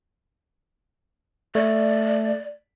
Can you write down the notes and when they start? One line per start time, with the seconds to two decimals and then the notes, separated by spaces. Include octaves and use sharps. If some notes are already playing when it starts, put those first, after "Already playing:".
1.55 A3 D5